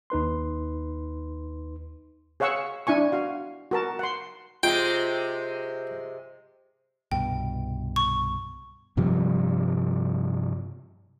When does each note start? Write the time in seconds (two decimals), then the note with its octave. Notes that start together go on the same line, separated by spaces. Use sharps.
0.10 D#2 D#4 B4 C6
2.40 G#4 C#5 F5 F#5 C#6 E6
2.87 D4 E4 G#5 C#6
3.12 F#4 F5
3.71 F#4 A#4 A5
3.99 F#5 C6
4.63 C3 G#3 F4 G5
7.12 C2 G2 B2 G5
7.96 C#6
8.97 G2 C3 F3 G3